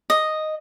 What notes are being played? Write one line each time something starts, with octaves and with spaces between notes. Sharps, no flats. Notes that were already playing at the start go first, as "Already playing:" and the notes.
D#5